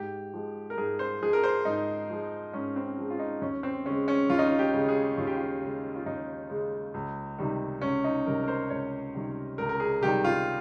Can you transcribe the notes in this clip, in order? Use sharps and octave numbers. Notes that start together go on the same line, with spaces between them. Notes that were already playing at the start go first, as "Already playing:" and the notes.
Already playing: G#2 G4
F3 G#3
A#4
G#2 G#4
C5
F3 G#3 G#4
A#4
C5
G#2 D#4
F3 G#3
G#2 C#4
C4
F3 G#3
F4
D#4
D#2 C#4
C4
C#3 G#3 C#4
C#4
D#2 F4
D#4
F4
G4
C#3 G#3
G#4
D#2 F4
G4
F4
C#3 G#3
F4
D#2 D#4
C#3 G#3
C#2
C3 D#3 G3
C#2 C#4
D#4
C3 D#3 G3 A#4
A#4
C5
C#2 C#5
C3 D#3 G3
C#2 A#4
A#4
G#4
C3 D#3 G3 G4
F4